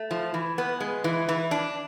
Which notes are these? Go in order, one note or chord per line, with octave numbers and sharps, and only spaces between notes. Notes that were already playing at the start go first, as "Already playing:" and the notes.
Already playing: A3
F3
E3
B3
G#3
E3
E3
D4